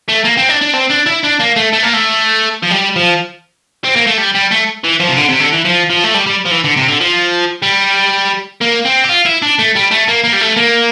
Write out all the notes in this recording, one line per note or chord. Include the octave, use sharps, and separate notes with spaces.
A3
A#3
C4
D4
D4
C4
D4
E4
D4
A#3
A3
A3
A#3
A3
F3
G3
F3
C4
A#3
A3
G3
G3
A3
E3
F3
C3
D3
C3
D3
E3
F3
F3
A3
G3
G3
F3
E3
D3
C3
D3
F3
G3
A#3
C4
G4
F4
E4
D4
A3
G3
A3
A#3
A#3
G3
A3
A#3